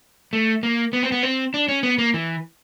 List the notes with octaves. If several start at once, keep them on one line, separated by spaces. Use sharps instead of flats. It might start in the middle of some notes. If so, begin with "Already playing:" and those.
A3
A#3
B3
C4
B3
C4
D4
C#4
B3
A#3
E3